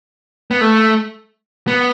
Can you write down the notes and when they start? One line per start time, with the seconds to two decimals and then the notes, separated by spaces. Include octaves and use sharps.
0.51 B3
0.61 A3
1.68 B3